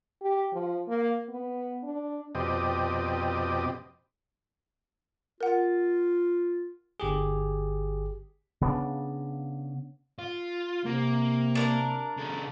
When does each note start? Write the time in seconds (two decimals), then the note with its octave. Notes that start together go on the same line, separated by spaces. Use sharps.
0.21 G4
0.53 F3
0.88 A#3
1.29 B3
1.83 D4
2.35 F2 B2 C4 G4 D5 D#5
5.41 F4 A#4 F#5
7.00 G1 G4 G#4
8.61 C#3 B3 C#4 D4
10.19 F4
10.85 C3 A#3
11.55 D4 A#4
12.18 C#3 A4